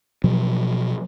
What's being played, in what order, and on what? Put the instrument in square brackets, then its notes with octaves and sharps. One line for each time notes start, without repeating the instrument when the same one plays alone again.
[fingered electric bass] B2 F3 F#3